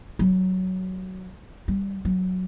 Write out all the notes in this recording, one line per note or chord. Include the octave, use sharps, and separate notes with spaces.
F#3
G3
F#3